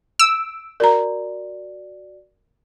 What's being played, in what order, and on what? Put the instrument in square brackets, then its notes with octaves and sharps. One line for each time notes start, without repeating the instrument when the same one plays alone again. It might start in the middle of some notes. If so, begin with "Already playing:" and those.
[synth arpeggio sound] E6 [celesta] D7
[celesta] F#4 D5 [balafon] A#4 A#5